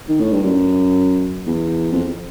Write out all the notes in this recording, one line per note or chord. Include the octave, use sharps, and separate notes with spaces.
D#3
A2
G2
F#2
E2
F2